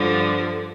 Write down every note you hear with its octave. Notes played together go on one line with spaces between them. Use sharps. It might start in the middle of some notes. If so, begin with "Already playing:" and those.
Already playing: G2 D3 F3